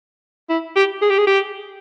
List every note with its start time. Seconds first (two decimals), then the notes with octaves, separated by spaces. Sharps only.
0.49 E4
0.76 G4
1.02 G#4
1.10 G4
1.18 G#4
1.27 G4